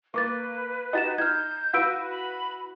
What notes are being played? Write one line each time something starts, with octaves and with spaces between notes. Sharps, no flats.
A#3 B4 C#6 D6 A6
D#4 F#4 G4 D#5 A6 E7
D#4 F6 G6 G#6
E4 F#4 B4 F5 E6 D7
B5